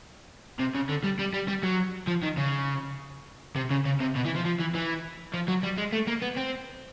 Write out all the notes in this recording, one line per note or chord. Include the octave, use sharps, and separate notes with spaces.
C3
C#3
D3
G3
G3
G3
G3
F#3
F3
D#3
C#3
C3
C#3
C#3
C3
B2
E3
F3
F3
E3
E3
F3
F#3
G3
G#3
A3
A#3
B3
C4